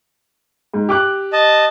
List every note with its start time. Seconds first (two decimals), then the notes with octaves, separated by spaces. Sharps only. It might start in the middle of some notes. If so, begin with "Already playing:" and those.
0.74 G#2
0.89 G4 D6 F#6
1.33 D#5 A5